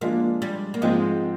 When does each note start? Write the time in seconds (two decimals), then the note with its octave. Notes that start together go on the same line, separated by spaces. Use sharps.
0.01 F3 G#3 A#3 D4 F4
0.42 G3
0.74 A#3
0.81 G#2 F3 G#3 C4 D#4